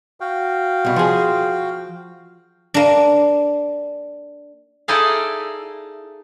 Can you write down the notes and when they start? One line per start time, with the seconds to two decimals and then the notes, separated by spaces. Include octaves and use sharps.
0.20 F#4 F5 G5
0.85 C2 B2
0.96 F3 G#4
2.74 A#3 D4
4.88 D#4 E4 G#4 A4 D5 F5